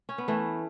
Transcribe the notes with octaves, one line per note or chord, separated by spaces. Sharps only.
C#4
B3
E3 A3